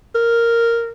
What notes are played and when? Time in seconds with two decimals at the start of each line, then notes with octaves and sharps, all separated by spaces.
0.15 A#4